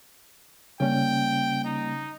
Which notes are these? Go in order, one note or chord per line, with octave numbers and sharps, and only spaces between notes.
C#3 G3 A#3 C#4 G5
D#4